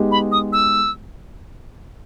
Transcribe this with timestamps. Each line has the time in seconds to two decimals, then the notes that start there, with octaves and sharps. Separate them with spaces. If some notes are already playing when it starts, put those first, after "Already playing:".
Already playing: G#3 B3 D#4 G4
0.11 B5
0.32 D#6
0.53 E6